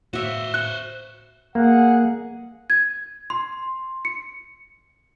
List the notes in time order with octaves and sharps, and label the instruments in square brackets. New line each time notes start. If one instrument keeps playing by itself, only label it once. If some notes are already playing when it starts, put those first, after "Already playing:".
[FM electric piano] A2 F5 [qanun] F#4 E5 [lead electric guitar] C5 C#5
[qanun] C#6 [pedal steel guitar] F#6
[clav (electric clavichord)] A#3 [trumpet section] G#4 F#5
[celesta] G#6
C6
C#7